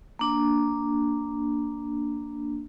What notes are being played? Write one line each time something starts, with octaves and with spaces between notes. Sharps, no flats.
A#3 D4